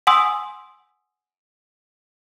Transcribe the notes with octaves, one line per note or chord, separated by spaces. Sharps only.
F#5 G#5 C6 D#6 E6